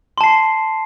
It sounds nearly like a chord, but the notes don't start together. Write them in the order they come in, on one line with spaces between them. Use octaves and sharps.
C6 A5 C7